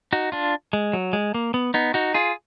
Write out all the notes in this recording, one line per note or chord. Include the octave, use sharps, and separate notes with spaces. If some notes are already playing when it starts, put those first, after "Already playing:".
D#4 F#4
D4 F4
G#3
F#3
G#3
A#3
B3
B3 D#4
D#4 F#4
F4 G#4